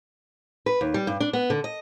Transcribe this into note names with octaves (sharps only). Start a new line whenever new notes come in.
B4
D#2
G3
G2
D4
B3
D3
D#5